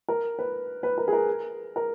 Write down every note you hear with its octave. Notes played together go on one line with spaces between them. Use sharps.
A#4
B4
B4
A#4
G#4
A#4
A#4